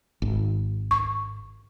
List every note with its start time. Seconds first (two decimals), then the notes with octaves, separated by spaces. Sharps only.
0.22 G#1
0.91 C#6